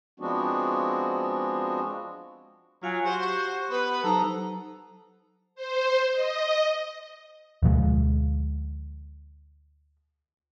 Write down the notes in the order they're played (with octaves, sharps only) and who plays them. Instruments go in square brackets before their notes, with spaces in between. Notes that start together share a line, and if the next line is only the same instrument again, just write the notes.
[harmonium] F3 G#3 B3 C4 D4 F#4
[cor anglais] F#3 [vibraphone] F4 F5 G#5
[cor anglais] F#4 [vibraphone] G4 [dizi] C5
[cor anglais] B3 [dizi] B4
[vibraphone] F#3 D#4 C5 [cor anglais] A4 [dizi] A#5
[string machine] C5
D#5
[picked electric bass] D2 B2 F3 G#3